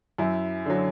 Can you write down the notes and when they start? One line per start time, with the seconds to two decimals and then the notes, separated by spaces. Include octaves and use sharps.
0.18 F#2 E4
0.66 D3 F#3